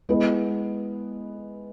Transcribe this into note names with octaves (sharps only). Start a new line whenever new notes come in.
G#3 B3 E4 B4 D#5